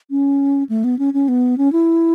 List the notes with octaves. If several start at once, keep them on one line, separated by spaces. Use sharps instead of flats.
C#4
A3
B3
C#4
C#4
B3
C#4
E4